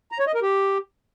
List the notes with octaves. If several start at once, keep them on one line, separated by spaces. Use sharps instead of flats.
A#5
C#5
D#5
A#4
G4